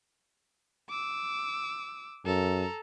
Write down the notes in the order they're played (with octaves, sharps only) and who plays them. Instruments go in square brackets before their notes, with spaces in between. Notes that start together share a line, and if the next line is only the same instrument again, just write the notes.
[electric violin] D6 E6
[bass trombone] F#2 [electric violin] A4 A#5